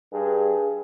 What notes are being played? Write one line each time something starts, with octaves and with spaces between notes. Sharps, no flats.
G2 D4 G#4